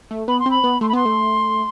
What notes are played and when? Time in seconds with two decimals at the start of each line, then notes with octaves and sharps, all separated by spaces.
0.11 A3
0.28 B3 B5
0.39 C6
0.46 C4 B5
0.64 B3
0.81 A3 C6
0.88 B5
0.93 B3 C6
1.05 A3